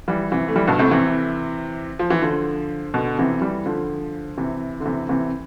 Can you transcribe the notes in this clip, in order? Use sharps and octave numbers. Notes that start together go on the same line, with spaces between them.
E3 G3
C3 E3
A3
E3 G3
G2 B2
A2 C3
C3 E3
F3
E3
D3 F3
B2 D3
C3 E3
E3 G3
D3 F3
C3 E3
D3
C3 E3
C3 E3